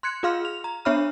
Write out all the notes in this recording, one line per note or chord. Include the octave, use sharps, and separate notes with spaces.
C6 F#6 G#6 C#7
F4 G#4 F5 C6 F6
F7
A#5
B3 D4 C#5 E5 B5 F6